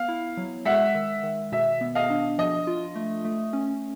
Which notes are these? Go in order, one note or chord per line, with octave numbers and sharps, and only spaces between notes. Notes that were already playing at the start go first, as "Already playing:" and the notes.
Already playing: B3 F5
E4
F#3
G#3 E5 F#5
D#3
D#3
B2 E5
B3
D#5 F5
D4
F3 D#5
F4
A3
A3
C#4